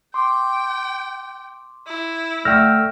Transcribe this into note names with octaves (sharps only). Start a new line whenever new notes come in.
G5 C6 D6
E4
D3 A3 E5 G5 E6 F6 G6 A#6